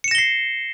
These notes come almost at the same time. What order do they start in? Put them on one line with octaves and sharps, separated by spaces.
C#7 E7 A#6 G7 C7